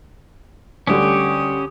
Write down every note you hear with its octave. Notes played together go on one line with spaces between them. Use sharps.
D2 D3 G3 C#4 G4 D#6